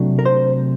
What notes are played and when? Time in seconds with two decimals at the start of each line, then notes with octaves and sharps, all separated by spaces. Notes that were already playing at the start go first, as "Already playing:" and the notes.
Already playing: C3 F#3 A3 D4
0.19 A#4
0.25 C5